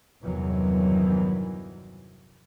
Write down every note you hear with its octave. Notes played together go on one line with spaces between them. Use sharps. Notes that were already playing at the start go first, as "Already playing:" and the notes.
G1 E2 C3 D#3 E3 F#3